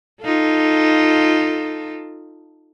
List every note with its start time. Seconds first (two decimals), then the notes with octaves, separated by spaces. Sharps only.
0.23 D#4 F4 A4